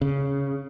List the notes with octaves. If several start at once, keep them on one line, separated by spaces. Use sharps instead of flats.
C#3